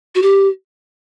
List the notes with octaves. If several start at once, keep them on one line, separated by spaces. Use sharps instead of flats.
F#4
G4